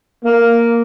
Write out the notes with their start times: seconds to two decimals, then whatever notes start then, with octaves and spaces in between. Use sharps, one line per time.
0.24 A#3